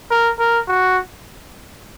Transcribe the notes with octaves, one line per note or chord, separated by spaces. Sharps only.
A#4
A#4
F#4